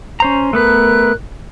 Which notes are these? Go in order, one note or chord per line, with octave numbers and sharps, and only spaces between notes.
C#4 C5 A#5
A3 B3 A#4 B4 F#6